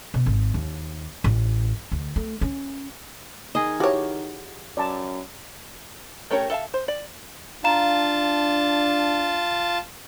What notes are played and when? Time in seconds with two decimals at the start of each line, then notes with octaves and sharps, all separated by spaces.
0.14 B2
0.26 G#1
0.54 D#2
1.24 A1
1.92 D2
2.16 A3
2.41 C#4
3.55 D#3 G#4 D#5
3.80 E4 F#4 G4 C#5 D6
4.77 F#2 D5 A5
6.31 A3 C#4 G4 A#4 C#5
6.50 A4 E5 F5 A5
6.74 C5
6.88 D5
7.64 D4 F4 F5 A5 A#5 E7